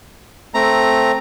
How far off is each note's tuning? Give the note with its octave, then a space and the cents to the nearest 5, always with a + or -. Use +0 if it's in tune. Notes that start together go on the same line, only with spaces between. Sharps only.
A3 +0 C4 +0 A#5 +0